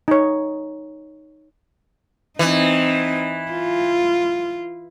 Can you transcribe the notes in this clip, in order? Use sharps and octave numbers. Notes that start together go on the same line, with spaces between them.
D#4 C#5
E3 C4 D#4
F4